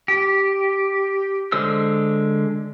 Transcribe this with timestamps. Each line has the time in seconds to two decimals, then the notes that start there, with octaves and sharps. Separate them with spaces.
0.08 G4
1.52 D3 G#3 C5 E6